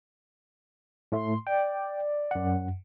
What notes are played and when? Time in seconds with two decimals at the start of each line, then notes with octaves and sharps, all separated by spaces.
1.12 A2 A3 C6
1.47 D5 G5
2.31 F#2 F#5